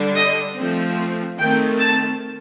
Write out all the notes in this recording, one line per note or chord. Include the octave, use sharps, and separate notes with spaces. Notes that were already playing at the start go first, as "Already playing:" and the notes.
Already playing: D3 G3 D4
D#5
F3 A3 C4
D#3 A3 C4 G5
A5